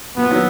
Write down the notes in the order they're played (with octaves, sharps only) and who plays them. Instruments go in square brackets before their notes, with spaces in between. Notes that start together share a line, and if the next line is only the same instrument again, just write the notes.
[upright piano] A#2 [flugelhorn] B3
[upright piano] D#3 F#3